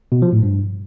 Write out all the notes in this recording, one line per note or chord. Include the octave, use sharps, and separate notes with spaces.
B2
F3
A2
G2